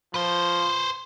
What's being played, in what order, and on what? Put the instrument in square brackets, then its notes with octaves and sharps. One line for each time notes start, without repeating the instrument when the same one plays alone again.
[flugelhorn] F3 [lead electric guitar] B4 C5